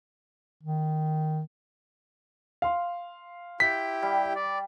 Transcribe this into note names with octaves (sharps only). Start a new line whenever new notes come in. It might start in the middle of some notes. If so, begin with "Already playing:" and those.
D#3
F5 C6
E4 G4 G5 B6
G3
D5